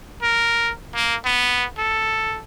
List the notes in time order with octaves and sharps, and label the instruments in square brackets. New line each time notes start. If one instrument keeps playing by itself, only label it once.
[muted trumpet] A#4
A#3
B3
A4